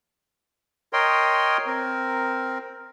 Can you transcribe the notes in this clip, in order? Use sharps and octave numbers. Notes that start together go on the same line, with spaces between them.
A#4 C#5 D#5 G5 C6
C4 A#4